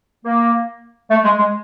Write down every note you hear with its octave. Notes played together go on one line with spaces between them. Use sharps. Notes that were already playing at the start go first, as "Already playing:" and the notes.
A#3
A3
G#3
G#3